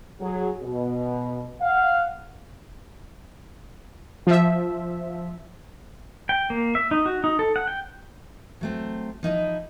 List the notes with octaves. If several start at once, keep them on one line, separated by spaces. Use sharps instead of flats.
F#3 G#4
B2
F5 F#5
F3 E5
G5
A#3
E5
D#4
F#4
D#4
A4
F#5
G5
F#3 A3 C4
F3 D#4 E4 D#5